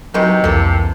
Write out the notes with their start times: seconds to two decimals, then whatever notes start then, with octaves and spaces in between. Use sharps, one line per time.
0.14 C3 D#3 E3 F#3 D#4
0.44 C2 F2 E3 A#3 A4